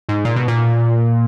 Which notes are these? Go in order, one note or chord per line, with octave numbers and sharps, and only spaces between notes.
G#2
A#2
B2
A#2